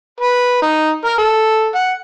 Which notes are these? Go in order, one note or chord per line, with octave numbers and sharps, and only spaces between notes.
B4
D#4
A#4
A4
F#5